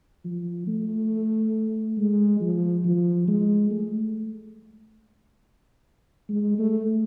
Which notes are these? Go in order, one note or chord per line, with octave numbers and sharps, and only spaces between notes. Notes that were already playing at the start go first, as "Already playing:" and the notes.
F3
A3
G#3
F3
F3
G#3
A3
G#3
A3